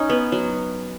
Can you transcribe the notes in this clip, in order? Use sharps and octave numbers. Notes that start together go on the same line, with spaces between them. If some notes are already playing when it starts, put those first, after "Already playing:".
Already playing: C#4 D#4
B3
F#3